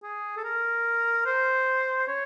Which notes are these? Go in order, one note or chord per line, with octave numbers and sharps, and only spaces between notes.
G#4
A4
A#4
C5
C#5